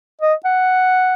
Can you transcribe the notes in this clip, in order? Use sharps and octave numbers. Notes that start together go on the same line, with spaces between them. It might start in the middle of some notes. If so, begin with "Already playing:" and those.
D#5
F#5